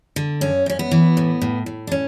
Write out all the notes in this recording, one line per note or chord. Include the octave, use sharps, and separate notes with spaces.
D3
F#2 C#4
F#2 C#4
B3
E3
A2
A2
A2
D4
C#4